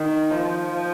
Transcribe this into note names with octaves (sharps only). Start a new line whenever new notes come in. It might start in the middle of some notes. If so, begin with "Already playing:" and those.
Already playing: D#3
F3